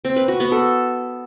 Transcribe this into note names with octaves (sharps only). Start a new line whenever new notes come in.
C4
B4
F#4
B3
A4